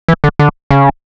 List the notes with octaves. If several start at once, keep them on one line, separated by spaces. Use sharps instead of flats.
E3
D3
D3
C#3